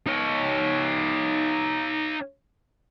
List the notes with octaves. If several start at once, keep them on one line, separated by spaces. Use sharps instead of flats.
D#4 C#5